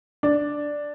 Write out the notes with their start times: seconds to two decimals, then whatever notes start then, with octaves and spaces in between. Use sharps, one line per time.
0.23 D4